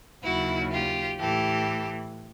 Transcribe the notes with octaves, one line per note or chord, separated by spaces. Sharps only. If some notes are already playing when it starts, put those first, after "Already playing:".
D#2 C#3 F#3 E4 F#4
F4 G4
A2 E3 G4 A4